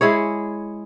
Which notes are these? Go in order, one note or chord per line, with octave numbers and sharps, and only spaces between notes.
G#3 E4 G#4 C#5